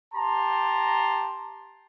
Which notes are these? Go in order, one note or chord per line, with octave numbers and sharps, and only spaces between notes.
G4 A5 A#5 C6